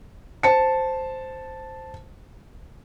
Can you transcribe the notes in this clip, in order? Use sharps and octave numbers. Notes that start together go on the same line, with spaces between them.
C5 A5 C#7